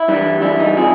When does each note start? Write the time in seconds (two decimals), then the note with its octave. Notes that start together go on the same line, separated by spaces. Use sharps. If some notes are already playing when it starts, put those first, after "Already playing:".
Already playing: E4
0.08 G2 E3 G3
0.41 G2 E3 G3 E4
0.59 D#4
0.77 C3 F3 G#4